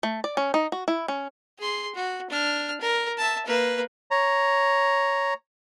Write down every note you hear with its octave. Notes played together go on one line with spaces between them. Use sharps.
A3
D5
C#4
D#4
F#4
E4
C#4
G#4 C6
F#4
D4 F6
A#4
E5 A5
A#3 B4
C#5 A#5